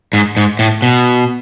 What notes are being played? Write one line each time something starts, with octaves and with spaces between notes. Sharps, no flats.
G#2
G#2
A2
B2